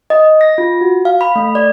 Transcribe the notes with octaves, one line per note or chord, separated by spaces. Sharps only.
D#5
A#6
F4
F#4
F5
B5
A3
D5